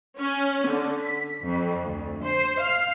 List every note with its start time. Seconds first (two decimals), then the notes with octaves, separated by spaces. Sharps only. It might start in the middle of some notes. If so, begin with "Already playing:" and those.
0.18 C#4
0.69 D3
1.02 B6
1.44 F2
1.85 D2
2.23 C5
2.61 F5